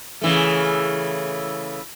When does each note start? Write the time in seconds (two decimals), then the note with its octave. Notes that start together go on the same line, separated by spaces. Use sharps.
0.21 C#3 E3 A3